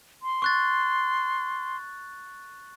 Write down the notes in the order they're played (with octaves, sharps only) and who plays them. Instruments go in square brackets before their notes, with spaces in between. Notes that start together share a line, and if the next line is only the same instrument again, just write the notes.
[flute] C6
[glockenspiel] C#6 F#6 A6